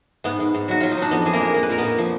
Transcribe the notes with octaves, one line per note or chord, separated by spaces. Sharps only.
G#2 B3
G#2
G#2
F#3 F#4
F#3 F4
D#4
F#3
D4
F2 B3
F2 G#4
A#3 A#4
G#3
A#3
B4
A#2 A#4
B3 B4
A#2
F3